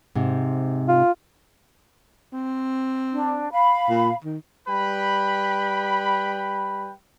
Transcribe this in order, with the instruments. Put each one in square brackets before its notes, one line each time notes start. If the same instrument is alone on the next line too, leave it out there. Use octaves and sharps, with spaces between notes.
[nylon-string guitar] G#2 C3
[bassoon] F4
[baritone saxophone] C4
[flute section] D4
F5 B5
[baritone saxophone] A#2
D#3
[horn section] G3 B4 G5 B5